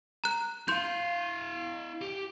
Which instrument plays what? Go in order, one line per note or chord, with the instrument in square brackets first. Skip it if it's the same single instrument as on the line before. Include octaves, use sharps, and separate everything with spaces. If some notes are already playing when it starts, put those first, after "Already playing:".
[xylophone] A#5 F#6
[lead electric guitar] E4 F5 [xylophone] C6 G6
[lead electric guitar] G4